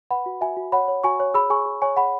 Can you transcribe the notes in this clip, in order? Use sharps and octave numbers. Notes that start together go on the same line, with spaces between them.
B4 F#5 B5
F#4
F#4 E5 G#5
F#4
C#5 F#5 B5
C#5
F#4 G#5 C#6
C#5
G#4 B5 E6
G#4 G#5 C#6
G#4
C#5 G#5 C#6
G#4 F#5 B5